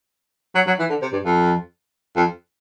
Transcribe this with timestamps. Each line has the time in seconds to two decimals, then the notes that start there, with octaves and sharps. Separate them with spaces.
0.55 F#3
0.67 F#3
0.79 E3
0.90 D3
1.02 C3
1.13 G2
1.25 F2
2.16 F2